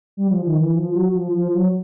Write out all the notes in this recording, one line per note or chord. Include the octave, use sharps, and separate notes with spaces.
G3
F3
D#3
E3
F3
F#3
F3
F3
F#3